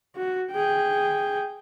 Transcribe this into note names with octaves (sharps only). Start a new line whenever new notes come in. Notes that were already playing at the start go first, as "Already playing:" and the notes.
F#4
G#4 G5